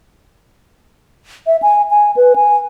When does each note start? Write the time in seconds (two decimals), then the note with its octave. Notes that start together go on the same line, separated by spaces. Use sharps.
1.47 E5
1.63 G#5
1.90 G#5
2.16 B4
2.36 G#5